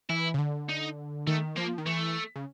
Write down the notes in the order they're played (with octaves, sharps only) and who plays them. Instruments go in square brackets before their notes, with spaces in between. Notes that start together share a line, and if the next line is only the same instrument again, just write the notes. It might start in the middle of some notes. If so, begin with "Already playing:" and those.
[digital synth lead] E3 [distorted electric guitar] E4
[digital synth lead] C#3
D3
[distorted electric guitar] D#4
[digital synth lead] D#3 [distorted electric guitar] A3
[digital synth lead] F3 [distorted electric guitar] A#3
[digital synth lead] D#3
[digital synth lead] E3 [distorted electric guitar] A3
[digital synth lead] C#3